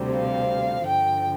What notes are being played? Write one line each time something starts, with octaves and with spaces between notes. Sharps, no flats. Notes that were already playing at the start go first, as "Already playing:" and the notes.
Already playing: D2 C3 G3 C4
F5
G2 D3 F3 G5